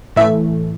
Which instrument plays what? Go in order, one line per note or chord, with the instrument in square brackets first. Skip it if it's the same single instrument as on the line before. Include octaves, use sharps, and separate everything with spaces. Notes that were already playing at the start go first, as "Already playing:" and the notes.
[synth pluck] A2 E3 A3 [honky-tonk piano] E5